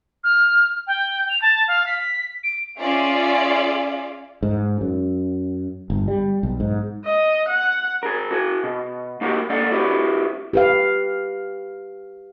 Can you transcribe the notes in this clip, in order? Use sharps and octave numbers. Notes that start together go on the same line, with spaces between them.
F6
G5
F7
A5
F5
B6
D7
C#4 F4 G#4 D5 E5 F5
G#2
F#2
G1
G3
B1
G#2
D#5
F#5
G#4 A#4
F#4 G#4
B2
A#3 D#4 F#4 G4 A#4
A#3 A4 D5 F#5
E4 F#4 G4 B4
G4 B4 F5